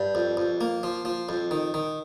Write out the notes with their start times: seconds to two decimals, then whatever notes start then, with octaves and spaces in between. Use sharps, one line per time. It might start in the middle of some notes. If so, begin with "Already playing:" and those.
Already playing: G2
0.15 F2
0.37 F2
0.61 A#3
0.83 F3
1.05 F3
1.29 F2
1.51 D#3
1.74 D#3